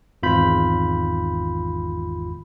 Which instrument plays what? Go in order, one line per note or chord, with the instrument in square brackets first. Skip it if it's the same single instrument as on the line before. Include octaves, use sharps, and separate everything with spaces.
[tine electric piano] G#1 E2 F4 B5 G6